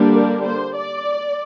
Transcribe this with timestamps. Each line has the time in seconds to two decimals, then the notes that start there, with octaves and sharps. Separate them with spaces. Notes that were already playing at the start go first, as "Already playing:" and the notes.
Already playing: D3 G3 A#3 D4
0.14 A#4
0.45 C5
0.76 D5